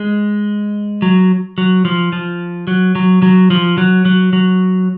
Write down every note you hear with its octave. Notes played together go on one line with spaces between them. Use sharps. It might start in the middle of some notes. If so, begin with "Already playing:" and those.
Already playing: G#3
F#3
F#3
F3
F3
F#3
F#3
F#3
F3
F#3
F#3
F#3